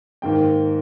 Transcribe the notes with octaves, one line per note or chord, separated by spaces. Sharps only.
G#2 D#3 A#3 G5